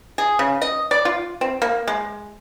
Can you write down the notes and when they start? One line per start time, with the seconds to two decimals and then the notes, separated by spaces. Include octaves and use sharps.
0.18 G#4
0.39 C#3
0.62 D#5
0.91 D5
1.05 F4
1.41 C4
1.62 A#3
1.87 G#3